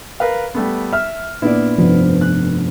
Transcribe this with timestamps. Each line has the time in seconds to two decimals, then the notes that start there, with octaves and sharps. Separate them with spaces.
0.20 A#4 B4 F5
0.54 G3 A3 B3
0.93 E5 F6
1.42 A#2 B3 D4 E4 D5
1.78 F1 G2 F3 B3
2.21 F#6